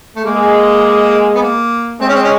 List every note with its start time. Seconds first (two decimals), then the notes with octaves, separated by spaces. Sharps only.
0.16 A3
0.24 G#3 A#3
1.35 B3
1.42 A#3
2.01 G#3 C4
2.09 C#4
2.15 C4
2.24 C#4